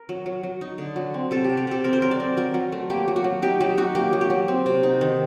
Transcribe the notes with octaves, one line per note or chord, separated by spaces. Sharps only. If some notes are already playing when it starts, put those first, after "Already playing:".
Already playing: A#4
F#3
F#3
F#3
D#4
D3
F#3
C4
C3 A4
C3 G4
G4
C3 A4
C4 A#4
C5
F#3 A#4
D5
C4
F#3 A#4
F#3
A3
A#3 G4
F#3
F#4
F#3
D#4 G4
F#3 G4
D#4 F#4
A#3 G4
F#3
G4
F#3
C4
C3
D#4
D#3